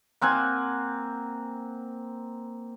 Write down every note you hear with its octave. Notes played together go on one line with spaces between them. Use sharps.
A#3 C4 F#5 G#5